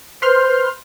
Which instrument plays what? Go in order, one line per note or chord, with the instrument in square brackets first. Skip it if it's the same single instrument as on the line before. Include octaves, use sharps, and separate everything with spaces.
[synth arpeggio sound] B4 C6 F6 [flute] C5